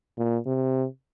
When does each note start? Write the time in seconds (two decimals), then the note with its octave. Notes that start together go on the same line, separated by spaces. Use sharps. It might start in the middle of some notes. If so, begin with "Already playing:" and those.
0.18 A#2
0.46 C3